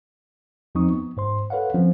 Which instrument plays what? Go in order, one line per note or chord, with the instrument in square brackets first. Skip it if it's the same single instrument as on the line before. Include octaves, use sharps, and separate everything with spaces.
[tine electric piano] E2 F3 C4 D#4 C#6 D#6
B3
G#2 C5 C6
A4 B4 C#5 F5 F#5
F3 C4 C#4